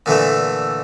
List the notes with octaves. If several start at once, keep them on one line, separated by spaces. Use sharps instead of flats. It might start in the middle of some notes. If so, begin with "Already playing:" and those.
A#2 D3 E3 A3